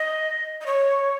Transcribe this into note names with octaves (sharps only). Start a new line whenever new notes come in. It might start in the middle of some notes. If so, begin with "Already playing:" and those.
Already playing: D#5
D#5
C#5